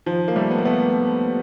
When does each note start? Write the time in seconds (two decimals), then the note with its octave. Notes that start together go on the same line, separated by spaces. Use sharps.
0.06 D#3 F3
0.28 A#3
0.36 G3 A3
0.51 B3
0.58 A#3
0.65 A3 B3